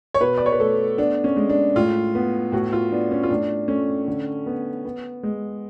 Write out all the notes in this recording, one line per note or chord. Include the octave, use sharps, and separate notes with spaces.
C#5
B2 B4
D5
C#5
B4
A3 A4
B3 D4
C#4
G#3
D4
A2 F4
B3
A2 F#4
F4
B3 D4
C#4
F4
A2 D4
A3 C#4
D3
B3
B3
G#3